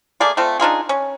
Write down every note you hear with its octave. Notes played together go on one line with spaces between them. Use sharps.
A3 A#3 G#4 D5
A3 C4 F4 A4
D4 D#4 F4 G#4
C#4